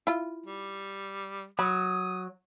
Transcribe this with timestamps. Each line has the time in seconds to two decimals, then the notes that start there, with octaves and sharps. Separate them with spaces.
0.07 E4 F4
0.46 G3
1.59 F#3 B5 D#6